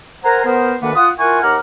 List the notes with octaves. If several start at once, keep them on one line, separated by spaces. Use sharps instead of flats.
A#4 C5 F#5 G#5 A#5
B3 A#4 C5
D2 D#3 A#3 D4 B4 F#5
F4 F#5 D#6
E4 F4 A#4 F#5 G#5 C#6
D#2 F#5 A#5 D6 F6